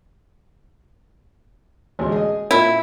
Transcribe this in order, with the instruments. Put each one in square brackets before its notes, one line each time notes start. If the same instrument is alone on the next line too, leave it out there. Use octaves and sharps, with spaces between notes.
[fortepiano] A1 D2 G#3
G#4 D#5
[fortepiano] A#2 [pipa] E4